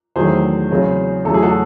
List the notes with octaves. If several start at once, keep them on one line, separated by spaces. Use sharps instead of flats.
E2 D#3 F#3 A3 G#4 C5
E2 C#3 F#3 C4
E2 C#3 F#3 A3 A4
G#4
F#4 A4